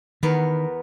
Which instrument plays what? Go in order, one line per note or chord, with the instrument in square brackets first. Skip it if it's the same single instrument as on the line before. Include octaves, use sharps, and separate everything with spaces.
[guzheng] E2 B3 A#4 [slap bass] D#3